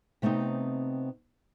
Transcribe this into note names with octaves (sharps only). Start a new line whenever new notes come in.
C3 A3 B3 C4 D#4